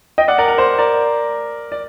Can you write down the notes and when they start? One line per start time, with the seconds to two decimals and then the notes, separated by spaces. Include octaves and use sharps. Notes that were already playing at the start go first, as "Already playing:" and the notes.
0.18 D#5 G5
0.28 D5 F#5
0.38 A#4 D5
0.48 A#4
0.58 C5
0.78 A#4 D5
1.72 D5